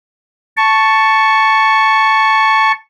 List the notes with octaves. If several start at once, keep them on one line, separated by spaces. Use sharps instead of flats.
A5 C#6